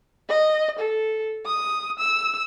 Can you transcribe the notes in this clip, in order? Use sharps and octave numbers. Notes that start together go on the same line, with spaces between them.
D#5
A4
D#6
E6